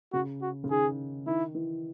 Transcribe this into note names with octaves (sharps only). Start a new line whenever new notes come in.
C#3 F#4
F#4
C#3
D#3 G#4
D#3 E4
E3